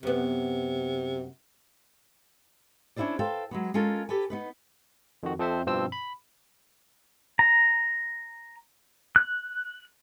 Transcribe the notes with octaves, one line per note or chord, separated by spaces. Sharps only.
F#2 C3 B3
C#4 D4 E4 F4 C5 D5
A4 B4 C5 F5 G5
F#3 G#3 B3
G#3 C#4 F4 A4 A#4
G4 A4 B4 G#5
B3 D#4 B4
F2 D#3 F#4
F2 F3 C4 A4 C5 E5
G2 B2 F3 C4 C5 E6
B5
A#5
F#6